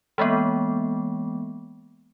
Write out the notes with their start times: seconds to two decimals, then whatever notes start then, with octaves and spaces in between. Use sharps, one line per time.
0.18 E3 G#3 A#3 B3